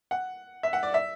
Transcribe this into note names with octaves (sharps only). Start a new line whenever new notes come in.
F#5
E5
F#5
D5
E5